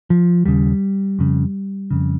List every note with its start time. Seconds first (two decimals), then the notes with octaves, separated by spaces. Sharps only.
0.10 F3
0.45 D#2 C#3 G3
1.19 F2 C#3
1.91 F2 C#3